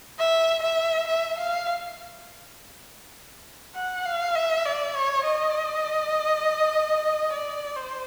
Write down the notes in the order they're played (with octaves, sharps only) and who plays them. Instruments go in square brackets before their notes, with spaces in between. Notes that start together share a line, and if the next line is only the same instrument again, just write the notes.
[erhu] E5
E5
E5
F5
F#5
F5
E5
D5
C#5
D#5
D5
C5